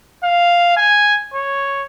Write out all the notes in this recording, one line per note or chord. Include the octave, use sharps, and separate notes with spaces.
F5
G#5
C#5